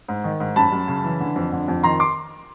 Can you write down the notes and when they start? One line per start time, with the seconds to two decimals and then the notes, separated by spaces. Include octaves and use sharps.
0.08 G#2
0.24 D#3
0.40 G#2
0.56 F#2 A5 B5
0.72 F#2
0.88 C#3
1.04 E3
1.20 D3
1.36 F2
1.52 D3
1.68 F2
1.83 D#3 A#5 C6
2.00 C6 D6